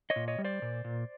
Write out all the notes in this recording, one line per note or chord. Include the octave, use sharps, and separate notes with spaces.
C#5 D#5
A#2
C#5 D#5
G3
C5 D5
A#2
A#2